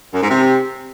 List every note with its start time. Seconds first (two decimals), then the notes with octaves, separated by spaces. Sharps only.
0.14 F#2
0.22 G#2
0.29 C3